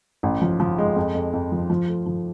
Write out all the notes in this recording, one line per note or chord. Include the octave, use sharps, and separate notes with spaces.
A1
F3
F3
G#3
F2
F2
F2
F3
F3
A3
F3